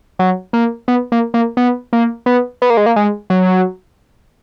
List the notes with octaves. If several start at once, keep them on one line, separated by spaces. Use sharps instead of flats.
F#3
A#3
B3
A#3
A#3
B3
A#3
B3
B3
A#3
G#3
A#3
G#3
F#3